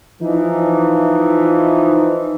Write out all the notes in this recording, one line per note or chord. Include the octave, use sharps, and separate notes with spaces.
E3 F3 D#4